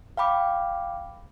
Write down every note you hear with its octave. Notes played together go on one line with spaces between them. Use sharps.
F5 G5 B5 D6